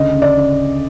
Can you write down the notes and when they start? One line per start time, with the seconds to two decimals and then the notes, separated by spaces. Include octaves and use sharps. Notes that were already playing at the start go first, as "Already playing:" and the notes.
Already playing: D2 C#3 D#5
0.14 C#3
0.22 D5
0.37 C#3